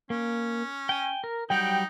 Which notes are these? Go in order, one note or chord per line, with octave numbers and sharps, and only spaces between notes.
A#3 C#4
G5 G#5
A#4
F#3 G3 D#4 F#5 G5